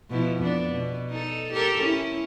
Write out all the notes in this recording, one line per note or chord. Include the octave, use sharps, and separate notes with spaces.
B2 F3 E4
F2 B3 D4
B2
D#4 A4
G4 A4 A#4
C#4 E4